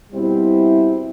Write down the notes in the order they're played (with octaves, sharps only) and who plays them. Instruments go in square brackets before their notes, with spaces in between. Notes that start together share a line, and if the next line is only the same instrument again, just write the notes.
[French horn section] B2 G3 C4 E4